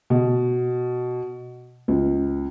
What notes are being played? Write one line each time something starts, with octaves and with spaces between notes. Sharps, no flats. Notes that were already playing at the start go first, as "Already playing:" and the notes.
B2
C#2